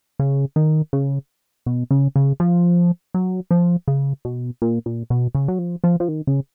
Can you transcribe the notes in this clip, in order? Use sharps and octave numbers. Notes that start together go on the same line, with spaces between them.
C#3
D#3
C#3
B2
C#3
C#3
F3
F#3
F3
C#3
B2
A#2
A#2
B2
C#3
F#3
F3
F3
F3
D#3
C#3